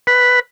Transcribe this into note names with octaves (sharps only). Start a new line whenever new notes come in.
B4